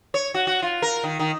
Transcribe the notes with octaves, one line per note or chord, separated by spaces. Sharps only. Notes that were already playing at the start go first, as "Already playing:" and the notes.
C#5
F#4
F#4
F4
A#4
D#3
D#3